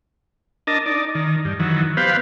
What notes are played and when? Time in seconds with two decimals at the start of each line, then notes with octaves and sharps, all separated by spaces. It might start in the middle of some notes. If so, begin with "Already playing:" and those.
0.67 D4 A#4 D#5 A5
0.86 D#4 D5
1.15 D#3
1.45 G2
1.59 D#3 E3 F#3
1.97 B3 G4 B4 C5 F5